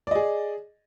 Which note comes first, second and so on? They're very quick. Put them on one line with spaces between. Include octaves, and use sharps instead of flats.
D5 D#5 G#4